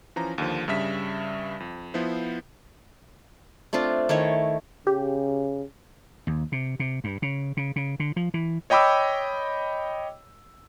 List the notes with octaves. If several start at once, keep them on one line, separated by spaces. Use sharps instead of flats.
E3 F3 C#4 A#5
D#2 D3 F3
G2 C#3 G3 E5 B6
F2
F3 B3 E4 C5
A3 C4 D4 F4
D#3 A3 E4 C#5
C#3 G4
D#2
C3
C3
G2
C#3
C#3
C#3
D3
F3
E3
C#5 D#5 G5 B5 D6 E6